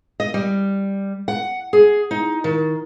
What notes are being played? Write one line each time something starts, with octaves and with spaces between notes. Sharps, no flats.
D#5
G3
F#5
G#4
D#4
D#3